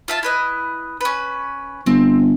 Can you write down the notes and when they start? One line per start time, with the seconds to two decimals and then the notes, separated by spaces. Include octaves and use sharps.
0.08 F4 E5 A5
0.23 E4 B4 D#5
1.01 C#4 B4
1.86 G1 C4